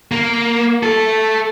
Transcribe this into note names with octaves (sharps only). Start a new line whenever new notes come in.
A#3
A3 A4